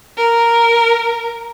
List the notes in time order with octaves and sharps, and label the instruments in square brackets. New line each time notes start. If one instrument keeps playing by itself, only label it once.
[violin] A#4